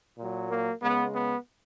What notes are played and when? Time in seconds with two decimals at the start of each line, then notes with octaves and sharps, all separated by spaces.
0.17 A#2 F#3
0.49 A#3
0.82 C#3 G#3 B3
1.14 B3